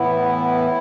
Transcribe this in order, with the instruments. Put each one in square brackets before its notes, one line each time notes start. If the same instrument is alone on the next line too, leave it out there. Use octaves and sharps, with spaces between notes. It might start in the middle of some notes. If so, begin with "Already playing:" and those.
Already playing: [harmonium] A2 E3 B3 E4